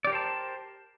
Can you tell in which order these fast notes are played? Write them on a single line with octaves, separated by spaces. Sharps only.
D5 G4 A#4 C5 A5